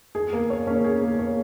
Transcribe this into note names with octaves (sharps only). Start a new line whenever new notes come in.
G#4
A#3
C#5
C#4
G#4
A#3
C#5